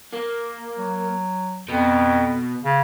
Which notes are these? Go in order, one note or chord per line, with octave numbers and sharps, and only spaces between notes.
A#3
F#3
F2 B2
C#3